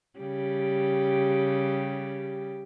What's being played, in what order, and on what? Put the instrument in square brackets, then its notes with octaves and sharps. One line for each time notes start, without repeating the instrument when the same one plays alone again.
[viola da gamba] C#3 G3 G4